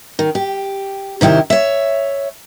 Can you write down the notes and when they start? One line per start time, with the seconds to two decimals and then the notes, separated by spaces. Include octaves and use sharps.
0.19 D#3
0.35 G4
1.21 C3 D#3 E4 G4
1.50 C#5 E5